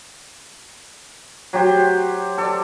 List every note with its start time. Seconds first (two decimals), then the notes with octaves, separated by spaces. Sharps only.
1.53 F#3 G4 C5
2.38 A4 D5